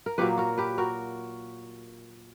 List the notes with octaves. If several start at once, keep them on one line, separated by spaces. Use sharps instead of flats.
A#4
A#2 F#3 A#3 G4 B4
F#4 A#4
G4 B4
F#4 A#4